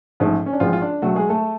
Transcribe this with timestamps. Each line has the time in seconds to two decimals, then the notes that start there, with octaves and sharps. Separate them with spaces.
0.20 A1 G#2 F3 A3
0.46 C#4
0.53 D4
0.60 A1 A2 F3 G#3 F4
0.73 F4
0.82 D4
1.02 C#2 B2 F#3 A3 F#4
1.16 G#3 G#4
1.29 A3 A4